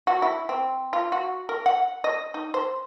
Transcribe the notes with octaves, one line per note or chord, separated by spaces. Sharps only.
F#4
E4
C4
F4
F#4
A#4
F#5
D#5
D#4
C5